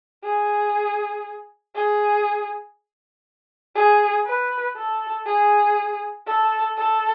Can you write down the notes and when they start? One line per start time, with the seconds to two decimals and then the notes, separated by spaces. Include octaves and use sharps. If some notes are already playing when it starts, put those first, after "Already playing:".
0.24 G#4
1.75 G#4
3.75 G#4
4.26 B4
4.76 A4
5.26 G#4
6.27 A4
6.77 A4